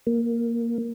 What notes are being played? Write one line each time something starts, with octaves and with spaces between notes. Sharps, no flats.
A#3